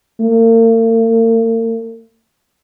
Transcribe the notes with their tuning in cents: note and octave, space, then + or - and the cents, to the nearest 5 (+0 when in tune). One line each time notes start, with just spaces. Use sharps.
A#3 -45